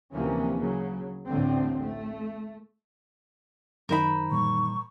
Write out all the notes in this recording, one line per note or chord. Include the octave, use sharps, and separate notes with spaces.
D2 C3 E3 F3 A#3 C#4
C#3 F#3
A1 D2 A2 D3 A3 C4
A3
F#2 D#3 D#4 A#4 C5 B5
A#2 E3 G3 C#6